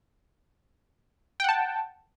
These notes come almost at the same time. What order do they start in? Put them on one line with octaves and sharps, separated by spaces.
G5 F#5 A5